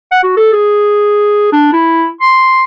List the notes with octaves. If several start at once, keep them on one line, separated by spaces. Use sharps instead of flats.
F#5
F#4
A4
G#4
D4
E4
C6